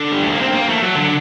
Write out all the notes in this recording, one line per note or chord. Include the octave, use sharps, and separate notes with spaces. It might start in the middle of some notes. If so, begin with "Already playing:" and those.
Already playing: D3
G3
A3
A#3
C4
A#3
A3
F#3
D3